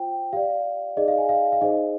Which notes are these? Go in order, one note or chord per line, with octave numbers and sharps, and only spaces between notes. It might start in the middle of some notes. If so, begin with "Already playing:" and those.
Already playing: F4 C5 G5
G4 D5 F5
D#4 G#4 D5 D#5
F5
G#5
F5
F5
D#4 G#4 C5 D#5